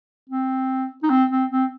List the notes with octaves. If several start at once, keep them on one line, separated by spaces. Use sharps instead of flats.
C4
D#4
C4
C4
C4